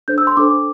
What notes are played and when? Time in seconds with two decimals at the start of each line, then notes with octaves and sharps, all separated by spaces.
0.08 D4 A4 C5 G6
0.18 E6
0.27 C6
0.37 D4 A4 C5 D6